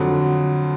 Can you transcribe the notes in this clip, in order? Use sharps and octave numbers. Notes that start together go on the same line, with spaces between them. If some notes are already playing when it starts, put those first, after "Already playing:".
Already playing: F2 D3 F#3 F#4